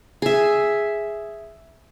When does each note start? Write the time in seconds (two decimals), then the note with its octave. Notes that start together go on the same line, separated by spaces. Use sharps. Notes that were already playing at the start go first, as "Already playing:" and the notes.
0.22 G#4 E5